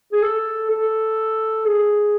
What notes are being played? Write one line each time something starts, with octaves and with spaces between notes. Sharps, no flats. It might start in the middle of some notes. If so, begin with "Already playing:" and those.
G#4
A4
A4
G#4